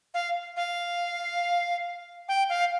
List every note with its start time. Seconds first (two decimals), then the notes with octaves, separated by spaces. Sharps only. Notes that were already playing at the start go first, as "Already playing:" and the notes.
0.14 F5
0.57 F5
2.28 G5
2.49 F5